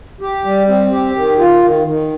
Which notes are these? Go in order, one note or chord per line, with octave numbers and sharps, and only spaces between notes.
G4
G3
C4
G4
D#3
F4
D#3
D#3